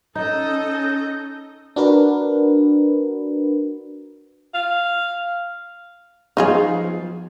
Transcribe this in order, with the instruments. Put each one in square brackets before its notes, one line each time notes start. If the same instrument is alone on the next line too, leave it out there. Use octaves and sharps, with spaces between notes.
[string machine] C#4 [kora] D#4 [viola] A4 D#5 [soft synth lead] G6
[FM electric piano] D4 F#4 A#4 B4
[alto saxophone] F5
[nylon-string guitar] F3 B3 [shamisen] D#4 F4 G#4